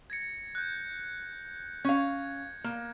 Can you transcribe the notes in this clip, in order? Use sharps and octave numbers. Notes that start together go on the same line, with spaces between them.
G#6 A#6 C#7
F#6 G6
C#4 F5 G#6
A#3